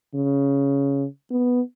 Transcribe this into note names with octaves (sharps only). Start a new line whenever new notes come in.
C#3
B3